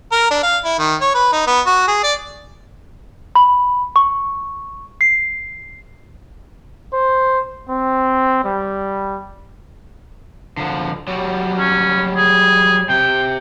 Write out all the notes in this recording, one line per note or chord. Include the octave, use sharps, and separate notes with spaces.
A#4
D4
F5
E4
D#3
C#5
B4
D#4
B3
F#4
G#4
D5
B5
C#6
C7
C5
C4
G3
D3 F3
F#3 G3
C#4
G#4
C3 G5